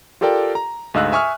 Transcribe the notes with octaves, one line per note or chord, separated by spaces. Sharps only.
F4 G4 A4 A#4 D5 G5
A#5
D2 G#2 D#5 F5 E6 F#6
E5 G#5 C#6 D#6 F6